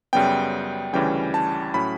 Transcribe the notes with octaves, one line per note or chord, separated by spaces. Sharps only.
F#2 C#3 G3 B3 G5
D2 C#3 E3 G3 C#4 G5
A5
A2 F#3 C#4 B5